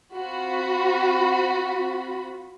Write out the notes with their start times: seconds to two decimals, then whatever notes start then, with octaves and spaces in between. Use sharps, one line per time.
0.15 C4 F4 F#4 B5